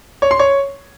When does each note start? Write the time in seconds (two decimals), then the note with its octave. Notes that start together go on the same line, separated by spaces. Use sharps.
0.22 C#5
0.31 C6
0.39 C#5